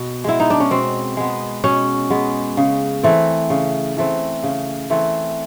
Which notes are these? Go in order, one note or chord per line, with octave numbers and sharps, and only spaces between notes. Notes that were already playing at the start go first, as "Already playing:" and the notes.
Already playing: B2 B3
G#3 B3 E4
D#4
D4
C#4
B2 C4
G#3 B3
B2 C#4
G#3 B3
C#3
E3 A3 C4
C#3
E3 A3 C4
C#3
E3 A3 C4